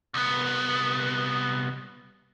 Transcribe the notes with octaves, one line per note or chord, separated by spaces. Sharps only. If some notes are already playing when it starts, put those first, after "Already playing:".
C2 B3